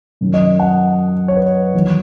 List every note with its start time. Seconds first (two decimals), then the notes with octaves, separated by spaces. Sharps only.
0.21 F#2 D#3 F#3
0.34 D#5
0.60 F#5
1.28 C#5
1.36 B4
1.74 E2 D#3 F#3